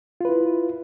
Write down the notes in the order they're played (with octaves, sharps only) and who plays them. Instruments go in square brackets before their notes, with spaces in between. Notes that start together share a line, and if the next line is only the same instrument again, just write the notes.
[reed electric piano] F4
B4
E4